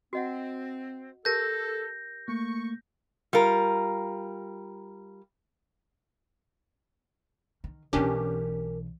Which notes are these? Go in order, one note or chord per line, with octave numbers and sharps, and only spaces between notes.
C4 F#4 D#5 F#5
G4 A4 A#4 A5 G6 A#6
A3 A#3 C#6
G3 F4 A#4
D#3
B1 E3 C#4 D4 G4 A#4